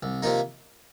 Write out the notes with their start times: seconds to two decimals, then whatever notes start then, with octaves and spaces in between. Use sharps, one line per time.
0.03 C2
0.22 C3 F3 A#3 D#4